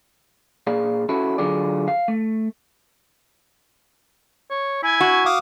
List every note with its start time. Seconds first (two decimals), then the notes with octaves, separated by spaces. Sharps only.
0.67 A#2 G#4 D5 F5
1.09 C#4 E4 F#4 A4
1.38 D3 F#3 F4 G#4 D5
1.88 F5
2.08 A3
4.50 C#5
4.83 E4 G#5
5.01 F#4
5.26 F5 D6 D#6